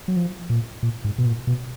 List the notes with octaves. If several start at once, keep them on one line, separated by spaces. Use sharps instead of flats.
F#3
F3
A#2
A#2
G#2
B2
A#2
B2